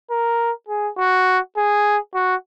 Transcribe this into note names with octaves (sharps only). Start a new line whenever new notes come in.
A#4
G#4
F#4
G#4
F#4